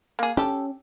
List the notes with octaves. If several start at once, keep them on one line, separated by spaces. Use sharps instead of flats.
A#3 G#4
C#4 G4 A4